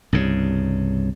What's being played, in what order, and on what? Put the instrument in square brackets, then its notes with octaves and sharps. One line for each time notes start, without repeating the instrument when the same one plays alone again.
[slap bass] C2 G2 C#3